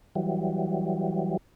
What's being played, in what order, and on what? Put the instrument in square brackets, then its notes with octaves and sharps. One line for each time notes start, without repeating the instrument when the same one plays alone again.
[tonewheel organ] E3 F#3 G3